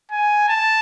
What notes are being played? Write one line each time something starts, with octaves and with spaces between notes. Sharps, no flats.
G#5
A5